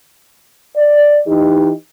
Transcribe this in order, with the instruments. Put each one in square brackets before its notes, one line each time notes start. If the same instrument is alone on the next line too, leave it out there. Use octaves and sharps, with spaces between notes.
[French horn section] D5
E3 D#4 G4